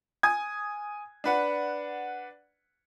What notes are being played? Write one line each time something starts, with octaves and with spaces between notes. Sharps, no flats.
G#5 D#6 G#6
D4 B4 F#5